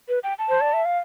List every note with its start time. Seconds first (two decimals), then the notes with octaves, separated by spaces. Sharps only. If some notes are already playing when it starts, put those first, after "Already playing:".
0.09 B4
0.23 G5
0.39 A5
0.49 C5
0.61 D5
0.73 E5
0.85 F5